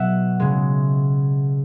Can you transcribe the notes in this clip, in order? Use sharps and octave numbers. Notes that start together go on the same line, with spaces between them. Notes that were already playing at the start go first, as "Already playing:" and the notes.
Already playing: B2 F#3 E5 F#5
C#3 G#3